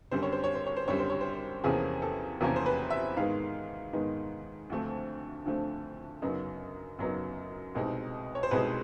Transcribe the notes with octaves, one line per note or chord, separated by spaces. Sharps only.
F#2 D3 G3 C4 C5
C#5
C5
C#5
C5
C#5
C5
F#2 D3 G3 C4 C#5
C5
C#5
C5
E2 C3 F3 A#3 C#4 G#4
A4
E2 C3 F3 A#3 C#4 A#4
C5
B4
E5
G#2 D#3 G#3 B3 F5
G#2 D#3 G#3 B3
D2 D3 F3 A3 C4
D2 D3 F3 A3 C4
F#2 C#3 F#3 B3 D#4
F#2 C#3 F#3 B3 D#4
C2 B2 G#3 C4 D#4
C#5
C5
C2 B2 G#3 C4 D#4 B4